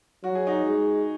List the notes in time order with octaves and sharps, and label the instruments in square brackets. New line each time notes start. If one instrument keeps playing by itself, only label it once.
[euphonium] F#3 [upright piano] F#4
[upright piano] G#4
D#4 F#4
[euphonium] G#3